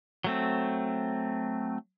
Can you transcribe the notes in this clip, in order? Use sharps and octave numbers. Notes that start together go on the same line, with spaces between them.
F#3 A3 C4